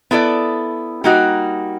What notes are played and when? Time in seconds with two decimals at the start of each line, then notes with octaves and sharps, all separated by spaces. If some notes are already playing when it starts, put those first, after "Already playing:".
0.11 B3 E4 A4 D5
1.04 G3 A#3 D#4 F#4